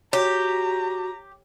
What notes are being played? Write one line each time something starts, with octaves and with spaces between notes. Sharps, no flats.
F#4 G4 C#5 A#5